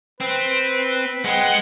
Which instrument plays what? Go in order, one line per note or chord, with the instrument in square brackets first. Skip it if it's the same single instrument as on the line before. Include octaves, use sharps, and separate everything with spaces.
[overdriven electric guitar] C4 [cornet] B4
[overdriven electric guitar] G#3 [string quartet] F#5 G5